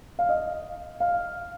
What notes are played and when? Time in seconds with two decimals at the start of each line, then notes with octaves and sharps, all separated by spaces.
0.19 F5
0.29 D#5
1.00 F5